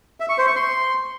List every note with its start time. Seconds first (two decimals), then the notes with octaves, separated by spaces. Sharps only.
0.20 E5
0.29 C#6
0.38 C5
0.47 C#6
0.56 C6